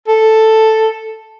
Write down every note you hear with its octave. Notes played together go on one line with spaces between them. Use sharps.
A4